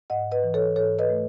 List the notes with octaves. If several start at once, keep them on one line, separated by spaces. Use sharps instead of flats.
G#2 D#5 F#5
B4 D#5
E3
A4 C#5
G#2 A4 C#5
B4 D#5
A3